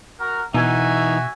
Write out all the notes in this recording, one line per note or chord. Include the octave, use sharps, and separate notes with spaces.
F#4 A#4
B2 E3 D#4 F#4 E5 G#5